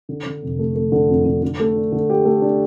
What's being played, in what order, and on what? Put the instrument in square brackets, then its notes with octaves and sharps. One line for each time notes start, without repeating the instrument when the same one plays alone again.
[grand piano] D3
D3
F1
A3
A3
D3
F2
D3
D3
A3
D4
D3
G4
A3
D4